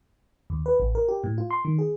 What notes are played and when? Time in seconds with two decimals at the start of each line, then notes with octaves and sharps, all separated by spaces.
0.50 D#2
0.66 B4
0.80 A1
0.95 A#4
1.08 G4
1.24 A2
1.38 F4
1.51 C6
1.65 D#3
1.78 G#4